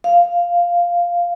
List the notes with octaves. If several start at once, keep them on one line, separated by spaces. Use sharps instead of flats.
F5